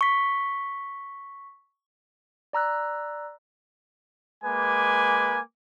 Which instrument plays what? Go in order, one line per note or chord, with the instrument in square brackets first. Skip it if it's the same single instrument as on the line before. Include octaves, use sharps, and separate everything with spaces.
[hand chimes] C#6 B6
[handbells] D5 A#5 E6 F#6
[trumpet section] G#3 A#3 B4 G#5 D6